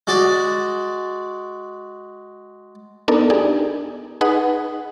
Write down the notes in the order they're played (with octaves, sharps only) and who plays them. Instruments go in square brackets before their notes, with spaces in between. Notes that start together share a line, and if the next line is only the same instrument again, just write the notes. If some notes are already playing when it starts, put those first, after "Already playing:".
[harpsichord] G#3 F#4 D5
[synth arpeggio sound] B3 D4 D#4 A4 A#4 D5
D4 D#4 G4 G#4 D5
D#4 G#4 B4 F#5 D#6